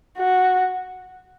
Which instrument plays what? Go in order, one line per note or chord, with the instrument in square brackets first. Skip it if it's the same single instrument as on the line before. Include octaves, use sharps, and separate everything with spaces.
[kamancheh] F#4